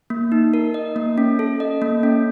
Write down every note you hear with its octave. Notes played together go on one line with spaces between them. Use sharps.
A#3
D#4
A#4
D#5
A#3
C#4
A4
D#5
A#3
C#4